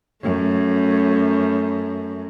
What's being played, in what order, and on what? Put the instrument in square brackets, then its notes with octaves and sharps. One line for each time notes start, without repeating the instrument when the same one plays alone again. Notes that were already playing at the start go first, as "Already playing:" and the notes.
[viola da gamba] F#2 A3